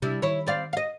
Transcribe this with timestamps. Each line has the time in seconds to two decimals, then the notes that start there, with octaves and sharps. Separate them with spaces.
0.02 C3 G3 D4 E4
0.22 D#3 E4 C#5
0.47 C4 D5 F5
0.73 D#5 F5